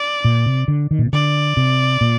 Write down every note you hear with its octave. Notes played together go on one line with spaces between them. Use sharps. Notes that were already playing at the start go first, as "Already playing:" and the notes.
Already playing: D5
A#2
C3
D3
D#3
A#2
C3
D3 D5
C3
A#2